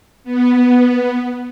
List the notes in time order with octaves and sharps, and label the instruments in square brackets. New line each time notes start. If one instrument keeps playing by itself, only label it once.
[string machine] B3